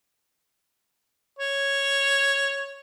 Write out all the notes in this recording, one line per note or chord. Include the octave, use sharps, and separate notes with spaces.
C#5